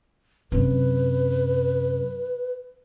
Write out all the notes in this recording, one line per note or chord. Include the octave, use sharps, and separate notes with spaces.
F#2 C3 B4